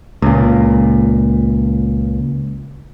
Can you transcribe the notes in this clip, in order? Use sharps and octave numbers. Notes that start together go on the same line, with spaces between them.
C#2 A#2